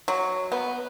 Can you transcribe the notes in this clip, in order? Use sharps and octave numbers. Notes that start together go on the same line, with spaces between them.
F#3
B3